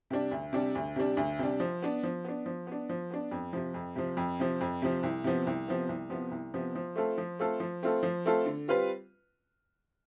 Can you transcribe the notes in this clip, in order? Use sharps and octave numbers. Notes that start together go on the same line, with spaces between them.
C3 G3 D4
D2
C3 G3 D4
D2
C3 G3 D4
D2
C3 G3 D4
F3
B3 D4
F3
B3 D4
F3
B3 D4
F3
B3 D4
F2
C3 F3
F2
C3 F3
F2
C3 F3
F2
C3 F3
C2
C3 F3 B3
C2
C3 F3 B3
C2
C3 F3 B3
C2
C3 F3 B3
F3
A3 C4 F4 A4
F3
A3 C4 F4 A4
F3
A3 C4 F4 A4
F3
A3 C4 F4 A4
D3
G3 C4 F4 B4